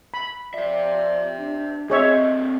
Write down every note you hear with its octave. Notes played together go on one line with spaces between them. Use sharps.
B5
F3 F4 C5 D5 E5
D4
D3 C4 G#4 C#5 D#5 E5